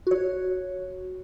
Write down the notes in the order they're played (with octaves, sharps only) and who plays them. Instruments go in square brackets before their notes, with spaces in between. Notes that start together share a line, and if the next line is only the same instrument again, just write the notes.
[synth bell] F#4 C#5